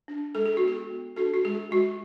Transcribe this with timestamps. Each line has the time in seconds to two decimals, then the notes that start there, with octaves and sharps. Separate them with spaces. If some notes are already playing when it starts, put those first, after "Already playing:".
0.08 D4
0.35 G#3 A4
0.46 G#4
0.57 F#4
0.63 B3 G#4
0.90 B3
1.16 D4 F#4 A4
1.34 F#4
1.45 G#3 G#4
1.71 G#3 F#4